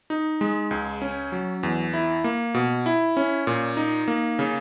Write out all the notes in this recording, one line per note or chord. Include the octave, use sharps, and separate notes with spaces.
D#4
G#3
C#2
C#4
F#3
E2
E4
A#3
B2
E4
C#4
A#2
D#4
A#3
C#3